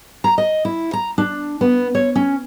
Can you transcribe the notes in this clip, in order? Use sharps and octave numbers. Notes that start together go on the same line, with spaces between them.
A#5
D#5
E4
A#5
D4
B3
C#5
C#4